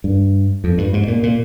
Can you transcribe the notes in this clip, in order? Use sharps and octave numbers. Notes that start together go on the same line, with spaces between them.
G2
F2
G2
G#2
A#2
A#2